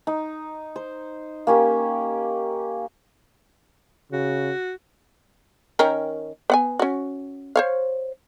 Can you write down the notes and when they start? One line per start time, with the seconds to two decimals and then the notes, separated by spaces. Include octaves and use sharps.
0.07 D#4
0.76 C5
1.47 A#3 C#4 G4
4.12 C#3 F#4
5.79 D#3 C#4 A#4
6.50 B3 F#5 G#5
6.79 C#4 F#4
7.56 C5 C#5 F5